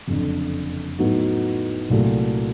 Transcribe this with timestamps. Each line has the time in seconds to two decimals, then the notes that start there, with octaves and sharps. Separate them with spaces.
0.07 F#1 F2 D3
0.99 A2 F#3 B3 D#4 F#4
1.90 C2 A#2 F#3 A3